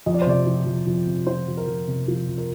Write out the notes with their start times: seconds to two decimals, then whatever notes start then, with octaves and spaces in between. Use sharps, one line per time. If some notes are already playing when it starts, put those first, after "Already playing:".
0.06 F2 D#5
0.14 D5
0.22 C5
0.27 C3 D5
0.47 F3
0.66 F2
0.87 F2
1.07 C3
1.27 F3 C5
1.48 F2
1.57 A#4
1.67 F2
1.88 C3
2.08 F3
2.28 F2
2.38 A#4